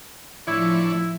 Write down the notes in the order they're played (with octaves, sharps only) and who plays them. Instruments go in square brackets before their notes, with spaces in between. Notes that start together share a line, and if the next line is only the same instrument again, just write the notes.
[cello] A2 F3 [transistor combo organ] E3 D4 C#5 [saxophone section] E4